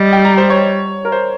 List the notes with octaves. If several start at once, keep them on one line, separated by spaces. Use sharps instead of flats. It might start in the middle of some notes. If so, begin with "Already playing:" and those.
Already playing: G3 D#5
G5
A#5
C5
C#5
A#4
C5